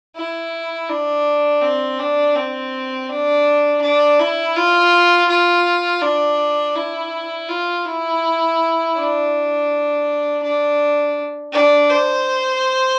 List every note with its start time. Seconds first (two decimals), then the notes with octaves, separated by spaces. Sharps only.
0.16 E4
0.89 D4
1.62 C4
2.00 D4
2.36 C4
3.09 D4
3.82 D4
4.20 E4
4.56 F4
5.29 F4
6.02 D4
6.76 E4
7.49 F4
7.85 E4
8.96 D4
10.43 D4
11.52 D4
11.90 C5